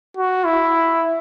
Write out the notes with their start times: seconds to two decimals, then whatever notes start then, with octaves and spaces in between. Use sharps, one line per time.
0.17 F#4
0.45 E4